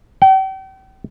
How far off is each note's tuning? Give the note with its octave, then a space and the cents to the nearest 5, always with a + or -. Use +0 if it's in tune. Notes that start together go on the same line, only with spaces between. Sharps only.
G5 -40